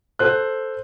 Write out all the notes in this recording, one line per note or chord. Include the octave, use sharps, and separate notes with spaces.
A4 C5 F#6